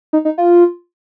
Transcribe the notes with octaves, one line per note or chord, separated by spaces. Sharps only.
D#4
D#4
F4